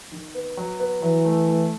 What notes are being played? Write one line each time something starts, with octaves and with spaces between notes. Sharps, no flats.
D#3
B3
F#3
B3
E3 F#3
A3
A3